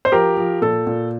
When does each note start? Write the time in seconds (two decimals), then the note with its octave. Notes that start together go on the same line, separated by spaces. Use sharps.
0.05 C5
0.12 F3 G4 A#4
0.37 F3
0.62 A#2 A4
0.87 A#2